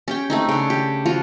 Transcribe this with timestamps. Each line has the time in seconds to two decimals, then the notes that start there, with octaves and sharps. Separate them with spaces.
0.08 C#4 G4 G5
0.30 A3 C4 D#4
0.49 C#3 D4
0.70 G4
1.06 F3 F4 F#4